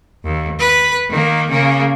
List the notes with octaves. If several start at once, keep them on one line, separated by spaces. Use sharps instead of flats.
D#2
B4
D#3 A#3
C#3 A#3